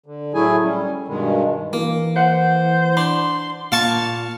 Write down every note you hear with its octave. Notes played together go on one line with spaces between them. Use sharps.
D3
A2 F#3 A3 E4 G#4 G#5
G3 C#4
G2 B2 D#3 G#3
E3 A#3
C5 F#5
D4 C6
A#2 F5 A5 C#6